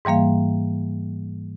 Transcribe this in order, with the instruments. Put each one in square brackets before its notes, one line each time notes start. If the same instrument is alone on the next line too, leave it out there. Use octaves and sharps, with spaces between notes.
[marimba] G#2 E3 G3 A#3 F5